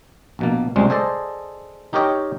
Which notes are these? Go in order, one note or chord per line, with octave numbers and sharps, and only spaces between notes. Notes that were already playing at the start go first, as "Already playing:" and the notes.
A#1 B2 A#3
C#2 C3 G3 G#3
G#4 A4 C5 D5 D#5
D#4 G4 A#4 C#5 D#5 G5